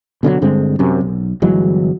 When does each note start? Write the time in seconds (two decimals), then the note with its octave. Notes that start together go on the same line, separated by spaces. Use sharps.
0.23 B2 D3 E3 F#3
0.42 G2 D3 G#3 C4
0.79 F#2 C3
1.01 B1
1.42 G1 E3 F#3 G#3